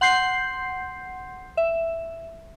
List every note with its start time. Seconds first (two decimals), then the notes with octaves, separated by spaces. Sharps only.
0.01 F#5 C6 G6 C7
1.57 E5